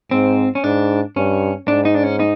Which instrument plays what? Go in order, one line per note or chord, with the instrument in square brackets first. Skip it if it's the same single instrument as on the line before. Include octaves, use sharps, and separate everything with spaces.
[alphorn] G#2 [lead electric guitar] C4
[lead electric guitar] C#4
[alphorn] G#2 [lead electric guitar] D4
[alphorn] G2 [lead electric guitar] C#4
[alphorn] G#2 [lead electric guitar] D4
[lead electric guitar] D#4
D4
C#4
D#4